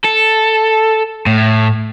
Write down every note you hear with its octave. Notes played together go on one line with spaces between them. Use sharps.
A4
A2